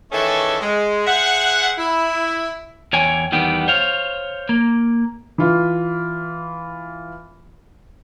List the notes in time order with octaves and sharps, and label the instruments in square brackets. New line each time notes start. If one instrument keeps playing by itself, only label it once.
[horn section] D#3 E3 A3 C#4 G#4 A4
G#3
G#4 C5 E5 F#5
E4
[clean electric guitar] E2 C#5 G5 G#5
E2 D#3 G3 B3 G5
C5 C#5 F5
A#3
[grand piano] E3 F4